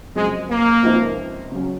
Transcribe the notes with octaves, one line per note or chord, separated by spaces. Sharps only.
F#2 C#3 F3 G#3 C4
A#3
C#2 C3 F3 C4 D#4
C#3 F#3 C#4